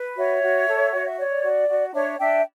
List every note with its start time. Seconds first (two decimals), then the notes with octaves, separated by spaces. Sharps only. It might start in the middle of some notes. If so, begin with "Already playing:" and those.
Already playing: B4
0.17 F#4 C#5 E5
0.43 F#4
0.68 A4
0.92 F#4 F#5
1.05 E5
1.18 C#5 D5
1.44 F#4
1.69 F#4
1.93 D4 C#5 E5
2.19 D4 E5 G5